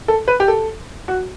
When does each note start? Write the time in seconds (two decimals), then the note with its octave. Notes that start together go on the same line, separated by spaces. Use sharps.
0.08 A4
0.28 B4
0.40 G4
0.48 A4
1.08 F#4